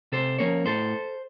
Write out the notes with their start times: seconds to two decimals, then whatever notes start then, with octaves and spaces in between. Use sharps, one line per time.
0.12 C3 A4 C5
0.39 F3 A#3 C#4 A#4 C#5
0.66 A2 A4 C5